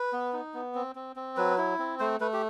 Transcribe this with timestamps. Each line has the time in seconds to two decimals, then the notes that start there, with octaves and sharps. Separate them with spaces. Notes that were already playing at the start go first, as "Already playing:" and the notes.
Already playing: B4
0.13 B3
0.33 D#4
0.54 B3
0.75 C4
0.96 C4
1.16 C4
1.37 F#3 B4
1.58 E4
1.79 C4
2.00 A3 C5
2.21 A3 B4
2.33 G4